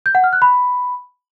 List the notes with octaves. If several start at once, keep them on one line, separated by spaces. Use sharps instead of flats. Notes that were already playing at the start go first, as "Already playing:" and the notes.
G6
F#5
F6
F#6
B5